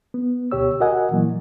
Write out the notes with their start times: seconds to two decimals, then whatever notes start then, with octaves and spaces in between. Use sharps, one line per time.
0.14 B3
0.51 D2 B2 G4 C#5 E6
0.80 F#4 A#4 D#5 F#5 G#5
1.11 A#2 E3 F#3 A#3